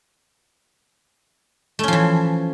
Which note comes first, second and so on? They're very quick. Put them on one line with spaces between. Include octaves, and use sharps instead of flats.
A3 C#4 F3 E3